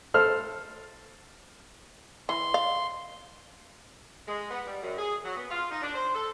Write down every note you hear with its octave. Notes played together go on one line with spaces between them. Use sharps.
A4 C5 F6
E3 C6
F5
G#3
B3
G3
F#2
G#4
F#3
B3
F4
D#4
D4
C5
A4